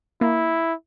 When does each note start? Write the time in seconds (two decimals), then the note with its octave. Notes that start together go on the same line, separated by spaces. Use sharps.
0.21 A#3 E4